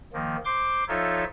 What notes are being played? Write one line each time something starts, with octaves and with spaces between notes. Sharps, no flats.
D#3 F3 A#3
C5 C6 D6
F3 D#4 F4 A4 C#5 E5